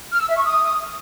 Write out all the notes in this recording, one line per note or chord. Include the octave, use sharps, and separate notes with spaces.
F6
E6
E5
C#6
D#6